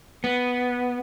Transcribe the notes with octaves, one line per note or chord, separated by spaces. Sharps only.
B3